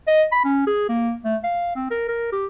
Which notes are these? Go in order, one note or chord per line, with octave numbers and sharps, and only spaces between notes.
D#5
B5
C#4
G#4
A#3
A3
F5
C4
A#4
A#4
G4